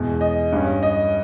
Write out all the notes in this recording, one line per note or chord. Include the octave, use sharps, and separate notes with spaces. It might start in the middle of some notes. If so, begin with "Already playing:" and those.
Already playing: E2 B2 G#3
D#5
G2 G3 C#4
D#5